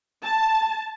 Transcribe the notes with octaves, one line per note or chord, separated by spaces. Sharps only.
A5